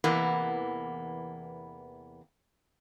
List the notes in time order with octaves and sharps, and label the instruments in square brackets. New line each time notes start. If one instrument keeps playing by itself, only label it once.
[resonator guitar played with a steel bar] E2 C3 E3 A#3 B3